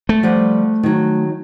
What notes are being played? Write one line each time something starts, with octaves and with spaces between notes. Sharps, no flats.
A3
F3 G3 F#5
D#3 F#3